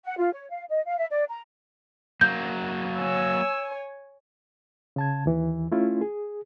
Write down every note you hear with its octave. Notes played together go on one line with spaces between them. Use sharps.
F#5
F4
C#5
F5
D#5
F5
E5
D5
A#5
F#3 A#3 G6
C#5 G#5 E6
C#3 A5 G#6
D#2 E3
A3 C#4 E4 F4
G#4